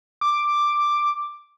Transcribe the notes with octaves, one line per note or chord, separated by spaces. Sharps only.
D6